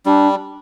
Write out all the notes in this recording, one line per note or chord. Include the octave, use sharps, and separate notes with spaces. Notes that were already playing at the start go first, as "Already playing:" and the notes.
G3 D4